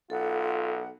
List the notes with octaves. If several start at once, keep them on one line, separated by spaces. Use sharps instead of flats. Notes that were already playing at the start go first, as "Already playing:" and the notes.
B1 F4 A4 F#5